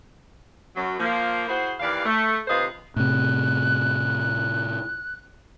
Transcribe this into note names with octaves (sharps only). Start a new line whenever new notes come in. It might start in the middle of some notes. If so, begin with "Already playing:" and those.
F#2 F#3
F3 A#3
E4 F#4 G#4 C5
D#2 E3 G4 D5 F5
A3
D#2 C3 F4 B4 C5 D#5
A2 C3 F#6